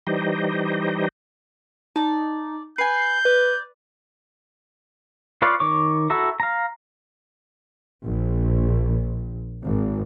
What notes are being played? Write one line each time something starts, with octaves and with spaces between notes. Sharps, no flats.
E3 G3 D#4 G4 C5 D#5
D#4 D5 A5
B4 G#5 G6 C7
B4 D5
F4 B4 C#5 D5 F5
D#3 C#5 C#6 D6
E4 F#4 A4 E5 A#5
F5 A#5
A#1
G#1